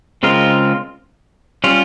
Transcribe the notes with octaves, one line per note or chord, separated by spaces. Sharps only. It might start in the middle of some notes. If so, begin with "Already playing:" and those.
C#3 G#3 C4 F4 A#4
G3 C#4 F4